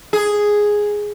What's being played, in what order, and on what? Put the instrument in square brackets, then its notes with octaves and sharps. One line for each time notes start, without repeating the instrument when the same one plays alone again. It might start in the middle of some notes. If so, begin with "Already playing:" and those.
[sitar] G#4